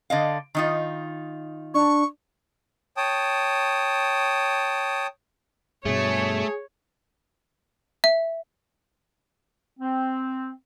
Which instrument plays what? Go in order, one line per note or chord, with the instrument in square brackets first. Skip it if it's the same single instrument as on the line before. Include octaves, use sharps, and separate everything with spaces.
[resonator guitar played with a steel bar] D3 D#5 F5
D#3 D#4 F4
[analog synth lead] D4 [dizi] C#6
[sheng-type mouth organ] C#5 G5 A5 D#6
[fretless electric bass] G2 B2 [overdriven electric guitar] A3 [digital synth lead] G#4 [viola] C#5
[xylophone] E5
[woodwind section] C4